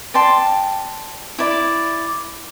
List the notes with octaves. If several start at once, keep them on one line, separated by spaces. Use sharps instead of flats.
D5 G5 A5 C6
E4 D5